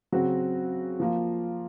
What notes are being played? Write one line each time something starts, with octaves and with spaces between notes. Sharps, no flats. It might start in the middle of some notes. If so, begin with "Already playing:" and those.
C#3 F#3 C4 F#4
F3 A#3 F4